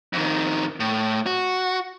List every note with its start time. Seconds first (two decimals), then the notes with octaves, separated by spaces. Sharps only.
0.13 F2 D#3
0.80 A2
1.26 F#4